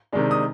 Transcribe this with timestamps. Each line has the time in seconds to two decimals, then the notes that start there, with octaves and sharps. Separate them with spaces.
0.13 C3 D#3 G#3 D4
0.31 D#6